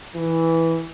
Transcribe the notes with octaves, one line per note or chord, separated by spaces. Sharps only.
E3